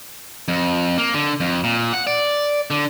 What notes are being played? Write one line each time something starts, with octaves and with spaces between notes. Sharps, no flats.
F2
A#3
D3
F2
A#2
F#5
D5
D3